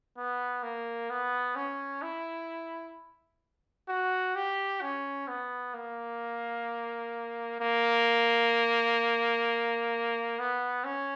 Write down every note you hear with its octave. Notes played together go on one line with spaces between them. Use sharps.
B3
A#3
B3
C#4
E4
F#4
G4
C#4
B3
A#3
A#3
B3
C#4